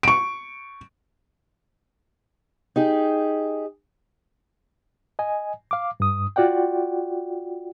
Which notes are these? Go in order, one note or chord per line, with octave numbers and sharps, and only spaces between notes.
C#6 D7
D#4 G4 G#4
D#5 G#5
F5 D6
G2 D#6
F4 F#4 D5 F#5 G5